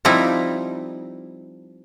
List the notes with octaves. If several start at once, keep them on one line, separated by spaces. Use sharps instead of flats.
F3 G3 C4 D#4 E4